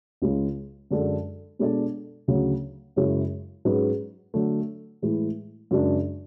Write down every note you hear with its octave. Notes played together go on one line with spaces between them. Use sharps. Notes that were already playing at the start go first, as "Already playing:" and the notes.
C#2 C#3 G#3
F#2 D3 G#3 D4 A4
B2 G#3 D4 A4 D5
D2 C#3 F#3
F#2 C#3 G#3 C#4 E4
G#2 F#3 C#4 G#4 B4
D3 F#3 A3
A2 E3 G#3
F#2 C#3 G#3 D4